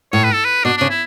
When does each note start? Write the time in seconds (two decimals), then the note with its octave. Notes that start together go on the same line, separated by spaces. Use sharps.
0.13 A2 C#5
0.24 B4
0.34 A4
0.45 B4
0.64 B2 D4
0.77 C#3 D4
0.90 E4